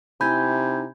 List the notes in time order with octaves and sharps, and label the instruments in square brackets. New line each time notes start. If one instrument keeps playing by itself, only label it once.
[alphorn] C3 [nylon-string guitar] D#4 E4 G#5 [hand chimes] B5 G6 G#6